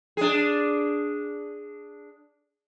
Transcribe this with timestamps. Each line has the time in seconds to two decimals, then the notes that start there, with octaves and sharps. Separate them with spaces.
0.17 D4 G#4